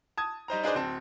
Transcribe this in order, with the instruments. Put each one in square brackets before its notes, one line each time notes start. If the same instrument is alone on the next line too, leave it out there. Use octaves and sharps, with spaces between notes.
[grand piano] A5 D#6 G#6
G3 D#4 C5 A#5
D4 D#4 G#4 B4 C5 D5
D1 C4 A5